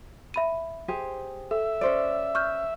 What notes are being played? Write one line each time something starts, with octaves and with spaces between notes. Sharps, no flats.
E5 B5 D#7
G4 G#4 C5
A4 E5
C#4 C5 D5
C#6 F6 G6